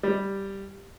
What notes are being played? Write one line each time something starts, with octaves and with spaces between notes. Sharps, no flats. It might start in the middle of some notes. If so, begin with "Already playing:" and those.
G3